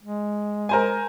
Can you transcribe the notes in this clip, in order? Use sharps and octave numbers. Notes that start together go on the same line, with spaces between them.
G#3
A#4 C5 G#5